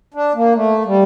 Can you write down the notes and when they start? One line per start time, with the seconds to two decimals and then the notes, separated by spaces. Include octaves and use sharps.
0.14 D4
0.35 A#3
0.55 A3
0.86 G3